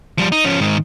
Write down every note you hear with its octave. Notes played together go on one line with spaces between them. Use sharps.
F3 G3
D#4
F3 C#4
G#2 D#3